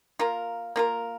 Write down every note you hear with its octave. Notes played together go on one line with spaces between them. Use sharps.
A#3 F4 A#4
A#3 F4 A#4